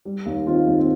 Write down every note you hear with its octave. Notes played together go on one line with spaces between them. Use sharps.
G3
D#2
D#3 C4 F4
D#2
C4